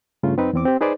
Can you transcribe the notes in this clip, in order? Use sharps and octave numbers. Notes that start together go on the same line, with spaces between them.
G2 C#3 A3 F4
F#2 C4 D#4 B4
E2 C4 D6
C4 G4
D#4 G#4 B4 C5 D5